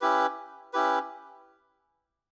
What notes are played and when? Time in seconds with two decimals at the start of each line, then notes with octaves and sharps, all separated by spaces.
0.01 C#4 E4 G4 B4
0.73 C#4 E4 G4 B4